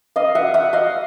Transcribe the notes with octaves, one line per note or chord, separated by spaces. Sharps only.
D#5 F5
E5 F#5
E5 F#5
D#5 F5